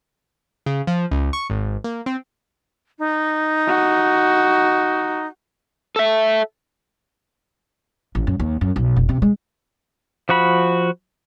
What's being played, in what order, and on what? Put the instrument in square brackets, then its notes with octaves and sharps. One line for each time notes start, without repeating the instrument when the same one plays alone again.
[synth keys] C#3
F3
C#2
C#6
G#1
A#3
C4
[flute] D#4
[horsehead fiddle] F#4
[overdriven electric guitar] A4 E5
[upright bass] A1
F#2
D#2
F#2
B1
F1
C3
G#3
[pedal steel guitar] F3 F#4 B5